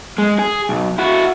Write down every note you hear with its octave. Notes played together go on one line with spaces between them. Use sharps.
G#3
G#4
B1
E4 F#4